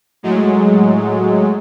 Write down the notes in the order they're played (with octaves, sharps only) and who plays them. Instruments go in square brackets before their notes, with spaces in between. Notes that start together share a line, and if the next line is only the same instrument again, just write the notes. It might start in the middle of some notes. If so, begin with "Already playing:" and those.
[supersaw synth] A2 F#3 G#3